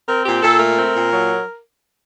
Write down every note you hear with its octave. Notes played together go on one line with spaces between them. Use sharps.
C4 A#4
A#2 G4
A#2 A4
A3 A#4
C4
A#2
F#3